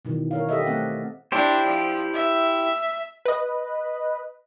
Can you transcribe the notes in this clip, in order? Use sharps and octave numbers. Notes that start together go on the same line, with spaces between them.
B2 D#3 E3
A#4 C#5 F5
G4 A4 D#5 E5
A3 C4 F#5
D4 E4 G4 C5
F3
E5
B4 D#5